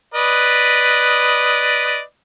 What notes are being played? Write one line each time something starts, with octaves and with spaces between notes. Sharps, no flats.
B4 D5 D#5